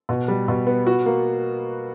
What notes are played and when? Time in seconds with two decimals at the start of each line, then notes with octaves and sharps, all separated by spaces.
0.09 B2
0.28 G3
0.48 B2
0.67 B3
0.87 F#4
1.06 A#3